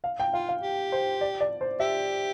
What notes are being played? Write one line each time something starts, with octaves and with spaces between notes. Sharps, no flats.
F5
G5
F4 F5
F5
G4
C5
D5
D5
C5
G4 E5